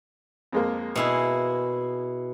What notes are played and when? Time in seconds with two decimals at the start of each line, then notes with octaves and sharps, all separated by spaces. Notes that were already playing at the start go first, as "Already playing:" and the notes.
0.52 F2 G#3 A#3
0.95 B2 E4 G#4